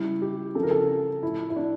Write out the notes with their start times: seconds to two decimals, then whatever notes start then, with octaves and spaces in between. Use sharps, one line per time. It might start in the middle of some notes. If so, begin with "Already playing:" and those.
Already playing: C#3 G3 E4
0.22 G4
0.55 C#3 F3 A4
0.63 A#4
0.71 A4
1.23 A2 F3 E4
1.50 E4
1.56 D4